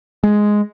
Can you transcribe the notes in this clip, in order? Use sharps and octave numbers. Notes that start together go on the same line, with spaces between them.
G#3